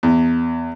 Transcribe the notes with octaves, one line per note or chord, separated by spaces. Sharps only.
E2